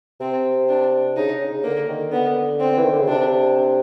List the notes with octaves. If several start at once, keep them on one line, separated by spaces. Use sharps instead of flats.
C3 C4
D4
C#3 D#4
C#3
C#3
D3 A#3
D#3
D3 B3
C4
E3
D#3
D3
C#3
C3 D4